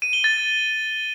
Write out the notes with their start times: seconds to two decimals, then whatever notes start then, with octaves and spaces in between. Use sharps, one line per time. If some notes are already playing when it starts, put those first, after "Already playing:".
0.02 D#7
0.13 G7
0.24 A6